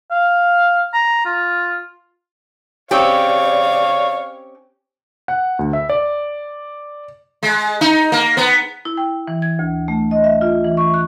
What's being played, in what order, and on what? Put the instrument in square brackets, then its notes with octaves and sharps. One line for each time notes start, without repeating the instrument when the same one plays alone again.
[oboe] F5
A#5
F4
[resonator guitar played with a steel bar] C4 C#4 G4 [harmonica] C#5 F5 [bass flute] D5
[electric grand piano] F#5
D2
E5
D5
[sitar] G#3
D#4
A#3
B3
[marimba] E4
G5
E3
G#6
D2
A3
D#5
E5
F4
E3
C#6
F#6